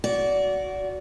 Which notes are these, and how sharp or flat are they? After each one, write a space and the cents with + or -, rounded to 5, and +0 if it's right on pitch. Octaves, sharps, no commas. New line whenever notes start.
F#4 +0 D5 -25